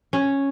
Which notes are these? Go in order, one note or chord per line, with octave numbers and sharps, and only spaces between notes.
C#4